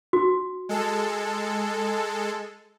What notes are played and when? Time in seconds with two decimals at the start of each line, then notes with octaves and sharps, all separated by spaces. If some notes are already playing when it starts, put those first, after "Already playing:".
0.13 F#4
0.69 G#3 A4